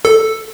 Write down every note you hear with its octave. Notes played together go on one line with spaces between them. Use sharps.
A4